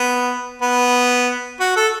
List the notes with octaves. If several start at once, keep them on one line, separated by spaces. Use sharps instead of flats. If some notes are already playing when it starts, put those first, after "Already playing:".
Already playing: B3
B3
F#4
A4